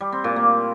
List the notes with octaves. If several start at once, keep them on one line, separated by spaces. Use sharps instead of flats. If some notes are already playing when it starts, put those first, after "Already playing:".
G3
C4
A#2
A#3